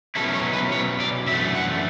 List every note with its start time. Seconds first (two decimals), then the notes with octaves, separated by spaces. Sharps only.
0.15 B2 F#3 C#4 E4 A4
0.34 C#5
0.53 B4
0.72 C#5
1.00 D5
1.27 F#2 E3 A3 D4 E5
1.55 F#5